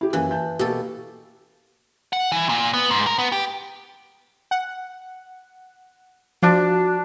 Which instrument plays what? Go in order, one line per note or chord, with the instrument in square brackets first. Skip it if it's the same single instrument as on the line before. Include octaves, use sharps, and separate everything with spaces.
[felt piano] E4 G4 G#4
[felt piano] F#2 A#3 F#6 [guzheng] E3
[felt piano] A5 G6
[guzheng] B2 A4 [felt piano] A#3 F#4 G4
[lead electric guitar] F#5
E3
A#2
B3
G#2
A#4
B3
G4
[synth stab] F#5
[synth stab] F3 [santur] D4 [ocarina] F#4